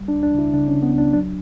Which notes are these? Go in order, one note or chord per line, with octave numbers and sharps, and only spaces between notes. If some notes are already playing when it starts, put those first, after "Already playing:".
Already playing: G3
D4
C#2
D4
C#3 E4
C#3 D4
C#4
C#3
B3
C#2 D4
F#3 D4